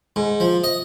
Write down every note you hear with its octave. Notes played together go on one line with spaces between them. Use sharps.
G#2
F3
D#5